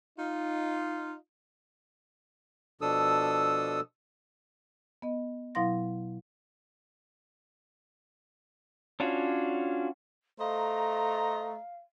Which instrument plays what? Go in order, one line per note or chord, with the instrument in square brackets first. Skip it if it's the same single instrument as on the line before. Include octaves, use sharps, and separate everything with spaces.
[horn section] D#4 F4
[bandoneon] B2 F3 D4 A4 D#6 E6
[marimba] B3 D#5
B2 F#3 E4 F5 C6 A#6
[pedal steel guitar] C#4 D4 F4 F#4 C#5
[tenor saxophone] A3 [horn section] C5 D#5 A#5 [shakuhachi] F5